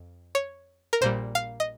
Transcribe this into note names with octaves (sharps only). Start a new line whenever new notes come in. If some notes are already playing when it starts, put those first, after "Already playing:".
Already playing: F2
C#5
A#4
A#1 A#2 G3 C5
F5
D#5